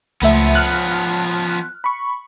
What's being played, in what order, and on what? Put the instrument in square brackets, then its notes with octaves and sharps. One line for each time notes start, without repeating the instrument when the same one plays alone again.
[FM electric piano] C#2 A3 E5 [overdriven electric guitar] F3 B3
[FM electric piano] F6 F#6
B5 C#6